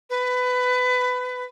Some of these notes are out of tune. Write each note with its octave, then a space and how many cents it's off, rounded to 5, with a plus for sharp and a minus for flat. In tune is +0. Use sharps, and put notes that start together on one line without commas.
B4 +20